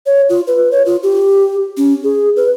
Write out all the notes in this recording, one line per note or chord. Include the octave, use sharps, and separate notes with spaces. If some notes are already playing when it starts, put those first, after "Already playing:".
C#5
F4
B4
C#5
F4
G4
C#4
G#4
B4